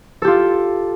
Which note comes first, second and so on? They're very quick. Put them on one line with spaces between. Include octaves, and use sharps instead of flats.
A4 G4 F4